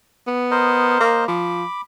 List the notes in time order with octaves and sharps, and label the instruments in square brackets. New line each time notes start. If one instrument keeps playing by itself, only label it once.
[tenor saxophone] B3
[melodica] A#4 C5 D#5
[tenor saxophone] A#3
[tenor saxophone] F3 [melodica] B5 D6